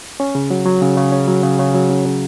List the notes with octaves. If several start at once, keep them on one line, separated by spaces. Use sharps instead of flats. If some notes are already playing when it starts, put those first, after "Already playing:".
C#4
C#3
F#3
F#3
C#3
C#3
C#4
F#3
C#3
C#3
F#3
C#3
C#3